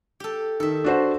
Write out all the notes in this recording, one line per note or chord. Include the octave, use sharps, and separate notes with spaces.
G4 A4
D#3 A4 E5
D4 F#4 C5